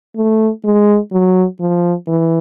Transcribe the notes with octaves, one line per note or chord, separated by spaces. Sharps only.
A3
G#3
F#3
F3
E3